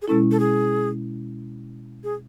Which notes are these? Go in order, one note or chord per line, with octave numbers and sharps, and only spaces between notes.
G#4
B2 G#3 C#4 E4 A4
A4
G#4
G#4